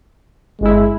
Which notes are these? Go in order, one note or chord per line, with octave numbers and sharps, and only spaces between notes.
G1 G#3 E4